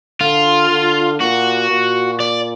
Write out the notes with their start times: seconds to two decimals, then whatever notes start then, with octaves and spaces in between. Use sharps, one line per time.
0.21 D3 F4
0.70 D3
1.20 A#2 F#4
1.70 A#2
2.20 D5